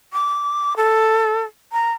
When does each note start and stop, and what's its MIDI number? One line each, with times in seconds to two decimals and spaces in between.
0.13 0.73 86
0.76 1.42 69
1.72 1.91 82